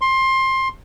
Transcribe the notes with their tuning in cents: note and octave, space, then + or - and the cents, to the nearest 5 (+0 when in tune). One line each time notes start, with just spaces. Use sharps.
C6 +20